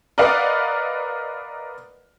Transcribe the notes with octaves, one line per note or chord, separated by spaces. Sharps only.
A#4 B4 D5 D#5 F5 F#5